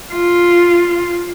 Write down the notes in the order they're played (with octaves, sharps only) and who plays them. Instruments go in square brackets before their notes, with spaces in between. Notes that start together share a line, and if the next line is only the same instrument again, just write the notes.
[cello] F4